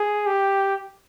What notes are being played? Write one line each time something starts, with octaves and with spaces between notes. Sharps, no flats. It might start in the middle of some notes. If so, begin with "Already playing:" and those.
Already playing: G#4
G4